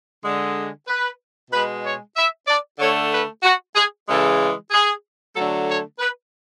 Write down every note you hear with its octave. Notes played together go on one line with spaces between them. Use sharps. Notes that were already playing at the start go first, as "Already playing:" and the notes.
D3 G#3
B4
B2 G#3 B4
C#5
E5
D5
D3 A3 C#5
B4
F#4
G#4
C#3 E3 G#3 A4
G#4
D3 F#3 A3 A4
C#5
B4